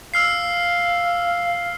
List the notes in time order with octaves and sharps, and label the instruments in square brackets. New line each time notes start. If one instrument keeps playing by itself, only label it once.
[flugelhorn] F5 [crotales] E6 F6 C7